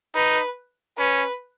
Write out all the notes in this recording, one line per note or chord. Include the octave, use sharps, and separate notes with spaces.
D#4 B4
C#4 B4